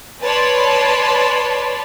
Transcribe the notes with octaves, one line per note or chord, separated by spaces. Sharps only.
B4 C#5 D5 A5 B5 C6